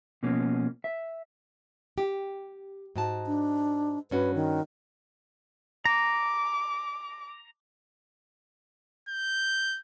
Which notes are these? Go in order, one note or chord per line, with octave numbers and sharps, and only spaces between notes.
B2 F3 A#3 C#4
E5
G4
G#2 F#4 A5
D4
G2 C#4 F#4 B4
D#3
A#5 D6
G6